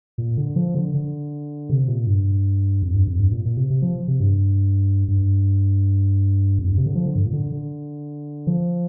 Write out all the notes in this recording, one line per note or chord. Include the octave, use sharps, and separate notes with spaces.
A#2
D3
F3
D3
D3
C3
A#2
G2
F2
G2
F2
G2
A#2
A#2
C3
C3
F3
C3
G2
G2
F2
G2
C3
D3
F3
D3
G2
A#2
D3
D3
F3